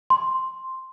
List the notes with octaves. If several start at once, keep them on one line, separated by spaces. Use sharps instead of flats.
C6